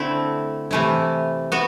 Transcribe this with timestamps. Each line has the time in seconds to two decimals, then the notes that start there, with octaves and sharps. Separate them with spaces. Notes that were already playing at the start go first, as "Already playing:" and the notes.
Already playing: D3 A3 C4 E4
0.71 C3 E3 A3 E4
1.52 B3 F#4